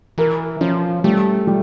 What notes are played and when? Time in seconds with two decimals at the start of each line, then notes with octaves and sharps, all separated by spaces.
0.18 E3 A#4
0.61 F3 C#4
1.04 G3 A3
1.47 G3